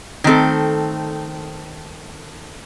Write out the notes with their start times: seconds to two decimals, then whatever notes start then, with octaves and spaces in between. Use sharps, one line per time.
0.24 D#3 A3 C4 A4